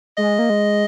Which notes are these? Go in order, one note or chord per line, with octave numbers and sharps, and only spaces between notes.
G#3 D#5
A#3
G#3